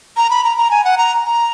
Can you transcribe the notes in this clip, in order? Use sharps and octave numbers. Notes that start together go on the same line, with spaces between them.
A#5
B5
A#5
A#5
G#5
F#5
A#5
A#5